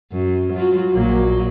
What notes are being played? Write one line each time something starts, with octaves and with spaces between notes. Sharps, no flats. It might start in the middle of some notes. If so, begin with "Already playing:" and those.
F#2
F#3 F4 F#4
A#1 F#3 A#3